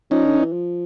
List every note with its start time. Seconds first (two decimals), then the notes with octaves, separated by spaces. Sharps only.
0.11 F3 C#4 D#4
0.25 D3
0.38 E3
0.52 F3